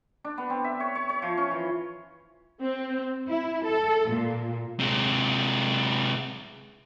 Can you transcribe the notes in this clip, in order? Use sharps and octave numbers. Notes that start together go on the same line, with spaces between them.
D4
B3
C4
E5
C#5
C#5
C#5
F3
C#4
E3
C4
E4
A4
A#2
C3 G#3